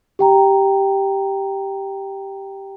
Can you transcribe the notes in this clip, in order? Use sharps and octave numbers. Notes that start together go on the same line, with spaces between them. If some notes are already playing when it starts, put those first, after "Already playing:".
G4 G5 A#5